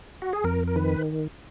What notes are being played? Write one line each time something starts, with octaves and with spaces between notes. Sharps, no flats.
F#4
G#4
F2 A#4
A#4
D#3 B4